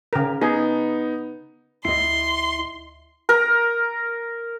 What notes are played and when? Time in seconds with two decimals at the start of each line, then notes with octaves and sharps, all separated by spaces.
0.13 C#3 A#4
0.41 B3 D#4 G#4
1.85 D2 E4 D#5 C6 C7
3.29 A#4